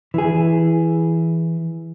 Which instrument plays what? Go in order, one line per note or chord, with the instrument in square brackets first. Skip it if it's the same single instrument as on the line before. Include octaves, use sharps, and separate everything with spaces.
[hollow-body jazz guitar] E3 G#4